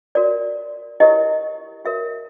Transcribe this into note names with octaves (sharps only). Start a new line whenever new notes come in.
F#4 A#4 C#5 D5
E4 G4 A#4 C#5 D#5
F#4 A#4 C#5 E5